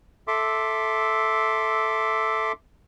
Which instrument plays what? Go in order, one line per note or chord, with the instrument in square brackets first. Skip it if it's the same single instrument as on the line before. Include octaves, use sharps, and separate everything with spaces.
[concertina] A4 E5 C6 D6